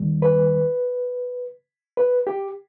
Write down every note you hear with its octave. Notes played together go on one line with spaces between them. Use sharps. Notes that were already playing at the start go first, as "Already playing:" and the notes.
Already playing: D#2 D#3 G3
B4
B4
G4